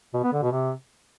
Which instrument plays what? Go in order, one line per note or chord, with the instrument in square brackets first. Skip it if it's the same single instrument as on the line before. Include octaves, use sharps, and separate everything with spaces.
[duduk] B2
B3
D3
B2
C3